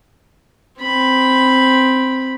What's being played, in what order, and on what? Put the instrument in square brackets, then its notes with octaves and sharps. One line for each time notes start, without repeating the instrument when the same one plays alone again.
[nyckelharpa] C4 B5